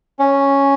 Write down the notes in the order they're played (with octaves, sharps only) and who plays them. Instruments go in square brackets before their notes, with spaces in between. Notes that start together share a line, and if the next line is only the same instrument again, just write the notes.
[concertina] C#4